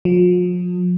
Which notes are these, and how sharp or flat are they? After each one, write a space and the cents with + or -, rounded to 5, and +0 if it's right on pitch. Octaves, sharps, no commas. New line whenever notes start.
F3 +40